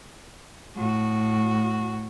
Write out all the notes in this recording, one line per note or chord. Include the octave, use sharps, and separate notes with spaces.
A2 F#4